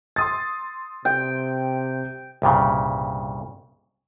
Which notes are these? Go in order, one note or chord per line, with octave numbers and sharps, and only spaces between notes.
C6 D#6 A6
C3 G5
C2 G2 A#2 C#3